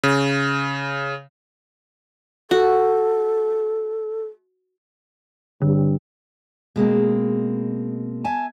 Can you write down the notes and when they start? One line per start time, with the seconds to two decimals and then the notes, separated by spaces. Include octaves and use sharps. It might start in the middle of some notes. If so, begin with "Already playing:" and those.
0.03 C#3
2.51 F#4 A4
5.62 G2 D3
6.76 B2 G#3 A#3 C4
8.24 E5 G#5 A5